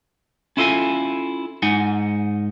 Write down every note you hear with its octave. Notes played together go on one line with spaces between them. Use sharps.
C#4 E4 F4 A4 F5 G#5
G#2 D#4 F#5 G#5